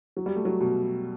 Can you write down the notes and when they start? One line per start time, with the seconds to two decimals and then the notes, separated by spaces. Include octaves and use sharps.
0.17 F#3
0.26 G3
0.36 A3
0.45 F#3
0.60 B2